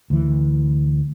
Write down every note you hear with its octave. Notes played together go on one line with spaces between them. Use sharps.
D2 E3